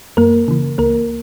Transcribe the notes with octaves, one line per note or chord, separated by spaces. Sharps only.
F#2 A#3 A#4
C#3 E3
C#2 A#3 A#4